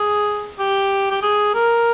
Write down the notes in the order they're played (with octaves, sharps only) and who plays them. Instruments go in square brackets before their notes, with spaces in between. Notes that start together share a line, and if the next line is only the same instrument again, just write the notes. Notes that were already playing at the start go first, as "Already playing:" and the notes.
Already playing: [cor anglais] G#4
G4
G4
G#4
A#4